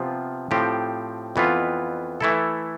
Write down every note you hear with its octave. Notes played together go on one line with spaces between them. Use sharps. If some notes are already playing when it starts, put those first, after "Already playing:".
Already playing: C3 F3 B3 F4
A2 F3 C4 G4
F2 E3 B3 F4 B4
E3 A3 E4 A4